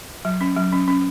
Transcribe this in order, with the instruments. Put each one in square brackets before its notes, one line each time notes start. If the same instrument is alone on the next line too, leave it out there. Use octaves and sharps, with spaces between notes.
[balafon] F#3
C#4
F#3
C#4
C#4